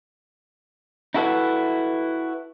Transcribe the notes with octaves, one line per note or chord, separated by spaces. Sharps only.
D#4 E4 F#4 A4 B4 E5